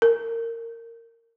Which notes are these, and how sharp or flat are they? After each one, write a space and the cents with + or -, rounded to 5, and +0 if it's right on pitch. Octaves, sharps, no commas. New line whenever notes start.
A#4 -20